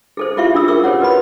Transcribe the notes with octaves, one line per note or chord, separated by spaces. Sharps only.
G#4 A4 C5
E4 F4 G4 E5 F5 C#6
D4 F4 G#4 D#6 E6
F4 G#4 A#4 C#6 E6
G4 C5 C#5 F#5
F#4 B4 D#5 B5